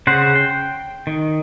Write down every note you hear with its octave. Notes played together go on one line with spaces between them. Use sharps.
C#3 C5 F#5
G5
D#3